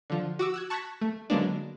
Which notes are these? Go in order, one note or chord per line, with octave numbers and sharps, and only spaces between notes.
D3 F3
F#4 D6 E6
E6 F#6 G#6
A5 C#6 F#6 G#6 A#6 B6
A3
D3 F#3 G#3 A#3 B3 D4